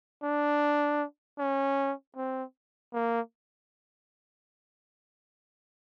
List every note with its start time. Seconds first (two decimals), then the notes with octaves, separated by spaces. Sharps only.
0.23 D4
1.39 C#4
2.17 C4
2.93 A#3